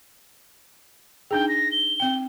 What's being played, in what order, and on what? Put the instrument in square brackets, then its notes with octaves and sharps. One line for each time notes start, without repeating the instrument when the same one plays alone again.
[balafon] D4 D#4 G#4 [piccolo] G5
[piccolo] A#6
G7
[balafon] C4 G5